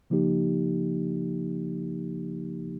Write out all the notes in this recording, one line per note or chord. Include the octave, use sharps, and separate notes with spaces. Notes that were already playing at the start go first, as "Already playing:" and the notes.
C#3 F3 A#3 D#4 G4